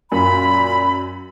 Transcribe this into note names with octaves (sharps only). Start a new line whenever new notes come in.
F#2 A#2 B5